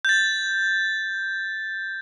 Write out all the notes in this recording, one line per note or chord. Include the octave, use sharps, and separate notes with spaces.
G6 A6